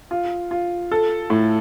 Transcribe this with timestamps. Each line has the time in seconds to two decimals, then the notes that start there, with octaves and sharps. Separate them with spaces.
0.11 F4
0.51 F4
0.92 A4
1.30 A2